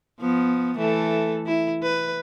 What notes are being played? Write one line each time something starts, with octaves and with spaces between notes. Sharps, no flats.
F3 B3
E3 A3 A4
E4
B4